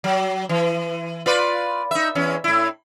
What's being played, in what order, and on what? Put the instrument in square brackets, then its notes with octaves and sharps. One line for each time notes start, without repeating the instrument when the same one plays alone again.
[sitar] F#3
E3
F4 B4 D5
D#4 E5
E2 C#4
A2 E4